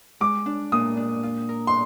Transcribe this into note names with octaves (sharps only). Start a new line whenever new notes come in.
G#3 D6
D4
A#2 D#6
D4
F4
A#4
C6